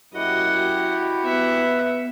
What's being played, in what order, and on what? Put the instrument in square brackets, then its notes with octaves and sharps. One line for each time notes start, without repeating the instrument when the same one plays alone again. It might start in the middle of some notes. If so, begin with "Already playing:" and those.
[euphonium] F#2 [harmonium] E4 [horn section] F#4 G4 [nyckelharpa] D#5 F#5
[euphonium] B3 [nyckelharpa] E5 F#5